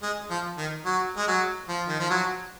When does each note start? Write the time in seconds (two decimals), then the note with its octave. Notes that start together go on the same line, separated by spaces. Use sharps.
0.02 G#3
0.30 F3
0.58 D#3
0.85 F#3
1.17 G#3
1.27 F#3
1.68 F3
1.88 D#3
1.99 F3
2.10 F#3